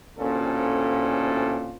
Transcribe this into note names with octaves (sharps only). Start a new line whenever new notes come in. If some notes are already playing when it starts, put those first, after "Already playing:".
A1 D2 A#2 C4 C#4 A4